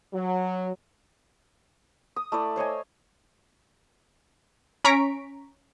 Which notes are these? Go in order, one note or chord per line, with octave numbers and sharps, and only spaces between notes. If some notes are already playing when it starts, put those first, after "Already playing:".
F#3
D#6
A3 E4 D5
C5 C#5 D#5 G#5
C#4 A#5 C#6 B6 D7